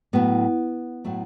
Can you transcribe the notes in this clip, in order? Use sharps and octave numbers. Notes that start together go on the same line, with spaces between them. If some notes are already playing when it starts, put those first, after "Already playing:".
A2 F#3 A3 B3
A2 F#3 A3